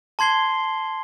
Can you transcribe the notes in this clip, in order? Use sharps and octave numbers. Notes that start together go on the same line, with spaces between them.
A5 C6 G#6 C7 G7